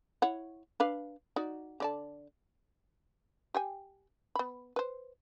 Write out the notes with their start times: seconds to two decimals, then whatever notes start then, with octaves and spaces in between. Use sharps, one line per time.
0.22 E4 C#5 F#5
0.80 D4 B4 F5
1.36 D#4 F#4 D5
1.80 D3 D5 A5
3.54 G4 G5 G#5
4.35 B3 B5
4.76 B4 C5